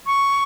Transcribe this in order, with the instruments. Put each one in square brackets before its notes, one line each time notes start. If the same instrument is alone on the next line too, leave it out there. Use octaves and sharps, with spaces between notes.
[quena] C#6